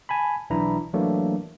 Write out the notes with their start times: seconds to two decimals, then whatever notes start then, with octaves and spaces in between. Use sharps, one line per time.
0.09 G#5 A5 B5
0.50 B1 E3 D4 E4 A#5
0.93 E3 F#3 A3 A#3 D4